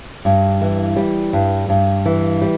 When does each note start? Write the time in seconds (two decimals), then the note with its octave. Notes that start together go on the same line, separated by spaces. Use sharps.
0.25 G2
0.61 E3
0.97 G3
1.33 G2
1.69 G2
2.06 E3
2.42 G3